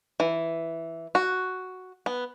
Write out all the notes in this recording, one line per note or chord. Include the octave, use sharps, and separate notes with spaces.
E3
F#4
B3